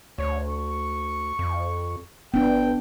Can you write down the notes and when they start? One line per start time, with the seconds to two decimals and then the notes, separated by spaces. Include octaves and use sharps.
0.18 D2 C#5
0.48 C#6
1.39 F2
2.34 G1 B3 D4 G5